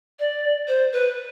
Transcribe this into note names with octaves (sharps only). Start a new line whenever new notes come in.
D5
C5
B4